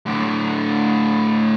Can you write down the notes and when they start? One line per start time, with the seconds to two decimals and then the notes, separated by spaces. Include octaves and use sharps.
0.06 A2 D3